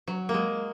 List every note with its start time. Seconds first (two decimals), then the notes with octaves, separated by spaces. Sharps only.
0.07 F#3
0.29 A#3
0.34 G#3